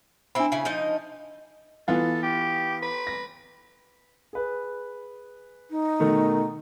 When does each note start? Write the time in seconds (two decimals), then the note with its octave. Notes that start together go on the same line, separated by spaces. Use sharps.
0.35 C4 D4 E4 B5
0.52 C#3 E4 G#5
0.65 F3 D#4 D#5
1.88 E3 B3 F4 A4
2.23 G4
2.83 B4
3.07 A#6
4.33 G#4 B4
5.70 D#4
6.00 B2 D#3 A3